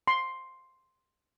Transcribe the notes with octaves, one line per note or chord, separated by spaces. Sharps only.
C6